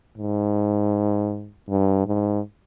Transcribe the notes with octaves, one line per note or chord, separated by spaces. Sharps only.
G#2
G2
G#2